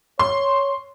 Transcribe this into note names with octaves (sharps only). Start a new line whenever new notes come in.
C#5 C6